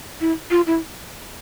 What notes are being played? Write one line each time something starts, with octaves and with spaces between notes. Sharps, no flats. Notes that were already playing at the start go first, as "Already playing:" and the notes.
E4
F4
E4